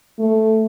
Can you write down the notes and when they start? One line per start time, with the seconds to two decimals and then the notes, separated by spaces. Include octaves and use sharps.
0.19 A3